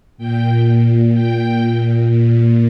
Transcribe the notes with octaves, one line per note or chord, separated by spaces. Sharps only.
A#2 G5
G5
A#2